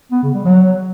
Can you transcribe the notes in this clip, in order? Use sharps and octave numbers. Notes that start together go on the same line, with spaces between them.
B3
C#3
G3
F#3